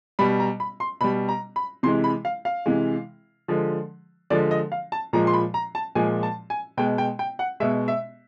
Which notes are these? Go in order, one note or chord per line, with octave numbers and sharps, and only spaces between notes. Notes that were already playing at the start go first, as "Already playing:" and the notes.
B2 G3 B5
A#5
B5
C6
B2 G3 B5
A#5
B5
C3 E3 G#3 C6
B5
F5
F5
C3 E3 G#3
D3 F3 G#3
D3 F3 G#3 D5
D#5
F5
A5
A#2 F3 G#3 A#5
C6
B5
A#5
A5
A#2 F3 G#3 G#5
A5
G#5
B2 G#3 G5
G5
G5
F#5
B2 G#3 E5
E5